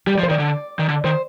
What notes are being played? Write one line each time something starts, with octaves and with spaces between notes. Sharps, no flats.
G3 G4
D5
F3
C5
D#3 D5
D3
D#3
D3
D#3 C5